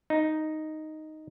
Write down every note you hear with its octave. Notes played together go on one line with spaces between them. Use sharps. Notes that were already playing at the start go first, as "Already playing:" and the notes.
D#4